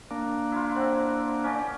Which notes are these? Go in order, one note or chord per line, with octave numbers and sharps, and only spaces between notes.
A#3 D4
E4 F4
C4 F#5
C#4 D5 G5